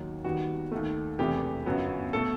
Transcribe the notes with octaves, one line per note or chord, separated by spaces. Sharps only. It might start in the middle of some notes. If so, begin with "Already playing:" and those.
Already playing: D#2 D#3 F#3
D#2 D#3 G3 B3 F#4
D#2 D#3 A3
E1 E2 C3 E3 A3 G4
G1 F#2 F#3 B3
B2 A3 A4